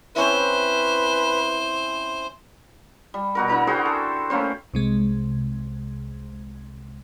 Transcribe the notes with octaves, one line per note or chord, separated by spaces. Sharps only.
C4 C#4 E4 B4 C5
G3
B2 F#4 A#4
D3 E4 A#4 A#5
F#4 G#4 C5 G5
A4
A3 A#3 C#4 C5
C2 C3 G#3